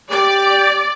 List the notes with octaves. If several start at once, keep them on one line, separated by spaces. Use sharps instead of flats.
G4 D5